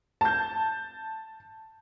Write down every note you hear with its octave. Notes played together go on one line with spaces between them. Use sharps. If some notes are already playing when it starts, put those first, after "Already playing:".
A5 G6